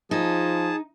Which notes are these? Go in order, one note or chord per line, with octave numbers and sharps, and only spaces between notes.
F3 D#4 G#4 A5